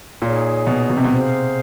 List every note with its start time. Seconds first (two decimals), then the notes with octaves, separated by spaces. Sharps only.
0.21 A#2 D#4 G#4 C#5 F5
0.67 B2
0.90 B2
0.97 C3
1.04 B2
1.13 C3 G#4 C5 F5